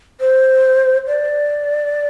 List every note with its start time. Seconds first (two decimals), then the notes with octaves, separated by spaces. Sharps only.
0.21 C5
1.07 D5